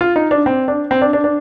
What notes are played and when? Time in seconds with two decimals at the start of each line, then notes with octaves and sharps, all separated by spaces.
0.01 F4
0.16 D#4
0.31 D4
0.46 C4
0.68 D4
0.91 C4
1.02 D4
1.13 D4
1.24 D4